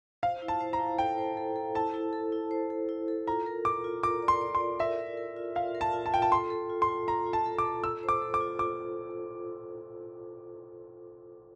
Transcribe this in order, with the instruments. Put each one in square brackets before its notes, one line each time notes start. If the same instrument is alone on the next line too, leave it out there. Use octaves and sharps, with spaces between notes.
[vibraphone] C5 [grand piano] F5
[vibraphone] E4
[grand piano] A5
[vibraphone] C5
[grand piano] A#5
[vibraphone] E4
[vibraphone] A4 [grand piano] G5
[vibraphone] C5
A4
A4
[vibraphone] E4 [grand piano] A5
[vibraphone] E4
A4
E4
C5
A4
E4
A4
[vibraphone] F4 [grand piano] A#5
[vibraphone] A#4
[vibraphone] A#4 [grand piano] D6
[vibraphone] F4
[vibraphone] A#4 [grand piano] D6
[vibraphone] D5
[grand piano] C6
[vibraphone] D5
[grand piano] C6
[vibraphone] D5
[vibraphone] A#4 [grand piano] E5
[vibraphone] A#4
A#4
F4
[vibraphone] F4 [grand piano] F5
[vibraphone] A#4
[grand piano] A5
[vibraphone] F4
[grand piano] A5
[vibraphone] F4 [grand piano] G5
[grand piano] A5
[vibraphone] A4 [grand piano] C6
[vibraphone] A4
F4
[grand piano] C6
[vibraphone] F4
[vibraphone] F4 [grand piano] A#5
[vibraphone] F4
[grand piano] A5
[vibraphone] A4
[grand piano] D6
[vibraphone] A4
[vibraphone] A4 [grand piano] E6
[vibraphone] C5
[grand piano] D6
[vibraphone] A4
[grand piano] D6
[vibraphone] F4
[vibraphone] F4 [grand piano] D6